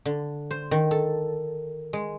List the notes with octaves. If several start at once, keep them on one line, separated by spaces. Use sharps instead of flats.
D3
C5
D#3
A4
G#3